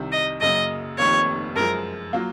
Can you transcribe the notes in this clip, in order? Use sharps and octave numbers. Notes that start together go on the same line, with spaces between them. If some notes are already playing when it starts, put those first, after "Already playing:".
Already playing: C2 C3 D#3
D#5
F#2 C#3 F#3 A#3 D#5
F1 F2 C3 D#3 A#3 C#5
F#2 F3 G#3 A#4
F#3 A#3 F4